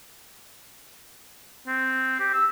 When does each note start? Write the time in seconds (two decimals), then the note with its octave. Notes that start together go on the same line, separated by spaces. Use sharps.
1.67 C4
2.20 G4
2.34 E6